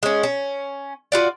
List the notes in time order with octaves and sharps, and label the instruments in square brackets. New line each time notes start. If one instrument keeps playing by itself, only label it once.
[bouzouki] G#3 C#4
C#4
F4 F#4 D5